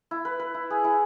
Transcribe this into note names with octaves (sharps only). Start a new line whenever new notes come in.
E4
B4
B4
E4
G#4
E4